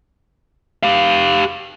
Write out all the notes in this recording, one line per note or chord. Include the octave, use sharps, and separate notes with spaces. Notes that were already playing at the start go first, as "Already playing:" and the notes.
G4 F5